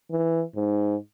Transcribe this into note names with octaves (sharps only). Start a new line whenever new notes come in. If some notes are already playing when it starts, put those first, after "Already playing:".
E3
G#2